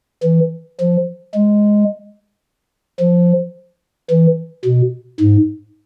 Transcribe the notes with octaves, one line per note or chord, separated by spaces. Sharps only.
E3
F3
G#3
F3
E3
B2
G#2